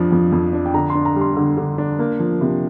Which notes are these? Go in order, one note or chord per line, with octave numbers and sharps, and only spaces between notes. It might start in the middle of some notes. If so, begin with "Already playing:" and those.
Already playing: F2 F3 D4
F2
F2
D4
G5
D3 A#5
C6
D4
A#5
G3
C6
D3
D3
D4
A#3
F3
C3